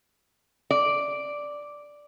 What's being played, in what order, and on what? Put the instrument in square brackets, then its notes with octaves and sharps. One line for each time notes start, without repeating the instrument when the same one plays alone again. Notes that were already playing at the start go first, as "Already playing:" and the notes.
[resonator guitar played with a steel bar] D5